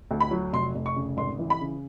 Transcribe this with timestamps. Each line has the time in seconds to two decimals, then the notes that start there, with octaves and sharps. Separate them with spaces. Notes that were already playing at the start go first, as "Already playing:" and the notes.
0.11 D2
0.20 B5
0.31 F#3
0.53 F1 C6
0.75 F1
0.86 C#6
0.96 C#3
1.17 G#1 C6
1.39 E3
1.50 B5
1.61 C#3